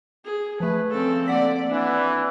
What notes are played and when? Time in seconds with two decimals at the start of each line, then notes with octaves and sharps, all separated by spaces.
0.25 G#4
0.60 F3 A3 B4
0.91 C#3 C4 A4
1.28 D3 A#3 D5 F#5 B6
1.70 E3 D4